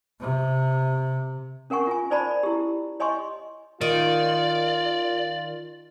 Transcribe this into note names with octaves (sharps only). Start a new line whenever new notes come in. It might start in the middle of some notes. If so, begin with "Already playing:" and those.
C3
C#4 A#4 F#5 G#5 C#6
F4 G#5
D#4 C5 D5 G#5 A5 B5
E4 G4
C#5 D#5 G#5 C6 C#6
D#3 F4 D5